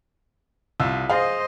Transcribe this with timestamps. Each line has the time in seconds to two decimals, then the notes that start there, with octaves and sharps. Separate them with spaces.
0.80 C2 F4 E6
1.10 G#4 C5 D#5 F5